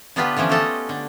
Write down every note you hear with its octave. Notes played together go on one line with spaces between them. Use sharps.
D3 B3 D4 F4 G4 B4
D3 E3 F3 C#4
A3 F4 G4 A4 D#5
D3